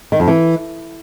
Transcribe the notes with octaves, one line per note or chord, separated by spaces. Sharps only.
D#3
F2
E3